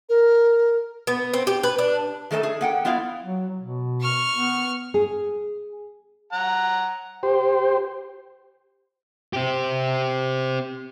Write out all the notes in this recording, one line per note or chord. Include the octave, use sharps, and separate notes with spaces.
A#4
B3
C4
G4
B4
D4
D#3 A3 A4 D#5 A5
G#4
A#3 F#5 G5
B3 E4 F4 D5 F5
F#3
B2
C#6 F6
B3
G#4
F#5 A#5
G4 C5
C4 G4